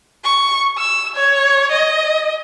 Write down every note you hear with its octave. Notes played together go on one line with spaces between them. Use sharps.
C#6
E6
C#5
D#5